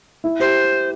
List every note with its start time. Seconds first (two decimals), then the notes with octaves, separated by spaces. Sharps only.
0.24 E4
0.40 G4 C5